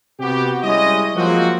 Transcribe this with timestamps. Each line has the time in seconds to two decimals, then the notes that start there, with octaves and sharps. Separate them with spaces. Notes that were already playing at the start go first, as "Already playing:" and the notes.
0.20 C3 B3 F#4 G4
0.63 G3 G#3 C#4 E4 D#5
1.16 F3 F#3 G#3 A#3 C4 F#4